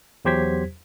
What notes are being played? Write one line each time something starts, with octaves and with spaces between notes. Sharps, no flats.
E2 F#3 G4 C5 G#6 B6